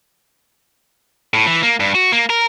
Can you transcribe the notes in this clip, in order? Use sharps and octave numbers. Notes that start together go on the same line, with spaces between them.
A2
E3
A#3
G2
F#4
A#3
A#4